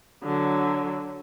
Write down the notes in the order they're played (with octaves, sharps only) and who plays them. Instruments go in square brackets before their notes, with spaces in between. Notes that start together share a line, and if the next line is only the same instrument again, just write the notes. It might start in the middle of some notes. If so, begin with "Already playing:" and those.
[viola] D3 F#3